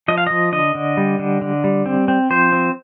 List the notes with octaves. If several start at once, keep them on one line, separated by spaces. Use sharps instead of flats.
F3 D#5
F5
F3 D#5
D3 D#5
D3
G3
D3
D3
G3
C4
C4
F3 C5
C4